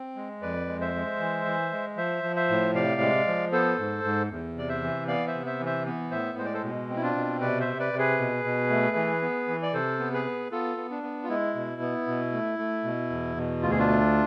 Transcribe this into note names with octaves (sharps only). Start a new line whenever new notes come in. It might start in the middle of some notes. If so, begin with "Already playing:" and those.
Already playing: C4
G#3
F2 B4 D5
G#3
C5 E5
G#3
E3
E3
G#3
F3 C5 E5
F3
C5 E5
A2
C3 D5 F5
G#3
F3
B3 A4 C5
G#2
G#2
E2
C3 D5
C5 E5
E3
B3 D5 F5
C5 E5
C3
C5 E5
E3
C5 E5
B3
A2 C5 E5
G#3 C5
D5
A4 C5
B2
C4
E4
D4 F4
B2
C3 B4 D5
C5 E5
C3
B4 D5
C3
G#4 B4
B2
B2
A3
E3
B3
E3
D5
C3 A4 C5
B3
G#4 B4
B3
B3 F4 A4
B3
D4
B3
F4
G#3 E4
B2
B3
B2
A3
A3
B2
E2
B2
D2 F4
G#4
D4 F4
A3